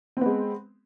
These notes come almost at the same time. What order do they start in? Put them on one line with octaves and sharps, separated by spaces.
C4 B3 G#3